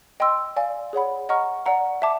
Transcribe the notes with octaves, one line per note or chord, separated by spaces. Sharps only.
D#5 G5 C6 E6
D5 F5 G#5
G#4 C#5 F#5 B5
D#5 F#5 A#5 C#6 F6
D5 F#5 A#5
E5 A5 D6